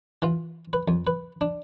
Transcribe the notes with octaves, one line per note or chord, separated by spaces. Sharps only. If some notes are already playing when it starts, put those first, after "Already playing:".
E3 F4
B4
F2
B4
D4